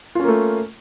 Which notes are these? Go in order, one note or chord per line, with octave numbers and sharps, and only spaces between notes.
A3 A#3 C#4 F4